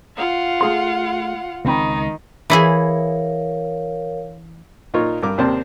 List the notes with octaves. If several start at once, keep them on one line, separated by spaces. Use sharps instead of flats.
F4 F5 F#5
A3 G#4 C6
C#2 D#3 C4 D#4 B5
E3 E4 G#4 A#4 C#5 F5
A#2 D#4 F4 A#4 C#5
G2 A#4 D6
D#2 C3 C4 A#4 D5 A5